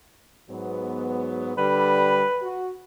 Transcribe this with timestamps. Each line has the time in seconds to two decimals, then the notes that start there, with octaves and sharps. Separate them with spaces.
0.50 G#2 F#3 B3
1.58 D3 G3 B4
2.43 F#4